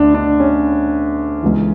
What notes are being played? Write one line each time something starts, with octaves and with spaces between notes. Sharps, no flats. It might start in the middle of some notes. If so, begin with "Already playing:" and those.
Already playing: D2 D3 D4
D4
C#4
C#2 C#3 E3